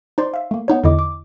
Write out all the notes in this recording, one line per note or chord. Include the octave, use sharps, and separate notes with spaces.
D#4 C5 D5 C6
E5 F5
A3 A#3
B3 D#4 C#5
E2 D3 E4 D#5 D6
D6